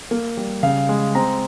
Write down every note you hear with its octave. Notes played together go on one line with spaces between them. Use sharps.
A#3
G3
C#3 F5
G#3
C4 A#5